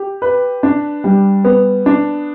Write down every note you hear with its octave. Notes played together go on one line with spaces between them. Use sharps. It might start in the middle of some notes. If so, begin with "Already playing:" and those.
Already playing: G4
B4
D4
G3
B3
D4